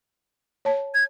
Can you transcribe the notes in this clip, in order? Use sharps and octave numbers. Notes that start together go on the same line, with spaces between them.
C#5 A5
G#6